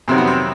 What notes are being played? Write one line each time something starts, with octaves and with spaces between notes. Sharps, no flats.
F2 C3 D#3 F#3 C4
B3
C4